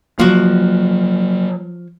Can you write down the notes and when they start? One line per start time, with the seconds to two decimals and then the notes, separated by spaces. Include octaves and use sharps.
0.20 F3 F#3 A#3 F#4